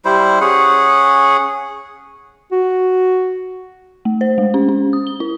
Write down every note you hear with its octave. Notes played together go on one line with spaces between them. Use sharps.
G3 E4 C5
C#4 G#4 F#5
F#4
A3
C5
G#3
C#4
C#4
D#6
G7
E4